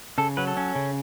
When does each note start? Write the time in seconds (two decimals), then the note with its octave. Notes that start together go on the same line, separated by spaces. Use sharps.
0.18 C#3 A4
0.37 F#3 B4
0.47 A4
0.57 C#4
0.75 C#3